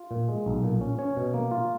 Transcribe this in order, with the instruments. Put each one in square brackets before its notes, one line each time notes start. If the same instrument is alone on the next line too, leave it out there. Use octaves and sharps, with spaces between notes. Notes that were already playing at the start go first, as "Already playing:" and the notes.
Already playing: [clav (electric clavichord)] F4
A#2
G#3
B1
A#2
C#4
C#4 C#5
B2
A#3
F4